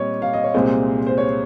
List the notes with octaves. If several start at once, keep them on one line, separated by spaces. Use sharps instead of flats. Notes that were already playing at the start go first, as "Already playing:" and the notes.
Already playing: A#2 G3 C4 C#5 D#5
F5
D#5
C#5
C2 A#2 G#3 C4 C5
C5
C#5